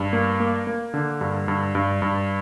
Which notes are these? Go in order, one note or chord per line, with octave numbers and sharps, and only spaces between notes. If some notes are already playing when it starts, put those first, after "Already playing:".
Already playing: G2
A#3
A#3
A#3
D3
G2
G2
G2
G2